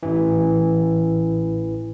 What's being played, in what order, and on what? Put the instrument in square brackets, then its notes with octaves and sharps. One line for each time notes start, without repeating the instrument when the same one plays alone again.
[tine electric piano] A1 E3